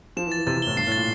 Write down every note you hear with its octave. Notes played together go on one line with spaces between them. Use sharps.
F3 E7
E3
A6
E3
C3 A6
C3
A2 G7
G2 C7
A2
A6
A#2